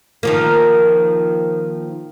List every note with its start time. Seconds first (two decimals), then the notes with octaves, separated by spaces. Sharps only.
0.23 D#3 F3 A#3